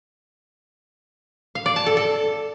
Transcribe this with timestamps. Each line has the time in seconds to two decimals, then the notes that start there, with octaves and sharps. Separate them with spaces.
1.55 F5
1.66 D5
1.76 A5
1.86 A4
1.97 A4